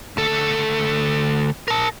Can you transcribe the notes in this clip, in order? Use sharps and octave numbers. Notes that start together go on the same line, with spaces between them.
D2 A4
A#4 A5